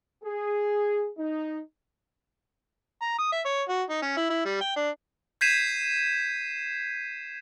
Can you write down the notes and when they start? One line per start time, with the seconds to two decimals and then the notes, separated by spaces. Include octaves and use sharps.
0.24 G#4
1.18 D#4
3.02 A#5
3.19 D#6
3.32 E5
3.45 C#5
3.69 F#4
3.90 D#4
4.02 C#4
4.17 E4
4.30 E4
4.46 G3
4.61 G5
4.76 D4
5.41 G6 G#6 B6 C7 D#7 E7